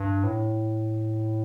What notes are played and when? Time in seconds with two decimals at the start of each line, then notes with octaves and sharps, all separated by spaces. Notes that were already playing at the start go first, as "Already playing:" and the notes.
Already playing: G2
0.23 A2